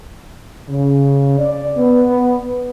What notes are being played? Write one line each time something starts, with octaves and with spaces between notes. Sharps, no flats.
C#3
D5
B3